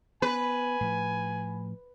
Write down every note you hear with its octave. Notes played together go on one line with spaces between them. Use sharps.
B3 B4 G#5
A2 F3